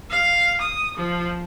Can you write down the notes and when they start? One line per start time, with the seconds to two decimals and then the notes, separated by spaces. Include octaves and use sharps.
0.11 F5
0.61 D#6
0.96 F3